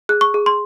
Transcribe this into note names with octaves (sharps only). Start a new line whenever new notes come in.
G#4 F#6
C#6
G#4
C6